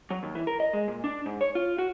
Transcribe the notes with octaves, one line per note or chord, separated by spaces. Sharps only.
F#3
D#2
E3
A#4
D#5
G#3
A#2
D4
G#2
C#5
F4
F#4